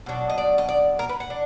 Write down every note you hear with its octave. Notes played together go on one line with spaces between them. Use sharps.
B2 F#3 D4
D#5
D5
D#5
D5
A#4
B4
F#5
D4